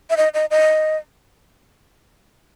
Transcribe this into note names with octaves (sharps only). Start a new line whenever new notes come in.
E5
D#5
D#5
D#5